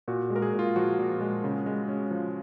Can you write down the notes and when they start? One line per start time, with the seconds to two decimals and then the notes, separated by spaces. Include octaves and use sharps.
0.08 A#2 F#4
0.30 G#3
0.36 A#4
0.42 G#4
0.53 A#2
0.59 F4
0.76 F3 F#4
0.99 A#2
1.21 G#3
1.44 C#3
1.66 G#3
1.88 C#4
2.11 F3